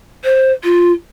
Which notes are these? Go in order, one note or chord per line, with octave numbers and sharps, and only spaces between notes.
C5
F4